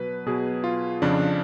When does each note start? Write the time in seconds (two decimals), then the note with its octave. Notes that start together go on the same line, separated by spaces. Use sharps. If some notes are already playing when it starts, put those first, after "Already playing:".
Already playing: B2 F#3 B4
0.26 B2 F#3 G#4
0.64 F4
1.02 F2 C#3 F3 D4